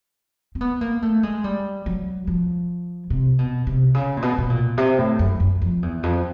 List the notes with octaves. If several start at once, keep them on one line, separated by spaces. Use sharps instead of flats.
C4
B3
A#3
A3
G#3
G3
F#3
F3
C3
B2
C3
C#3
A#2
B2
B2
A#2
C3
A2
F#2
F#2
F2
E2
F2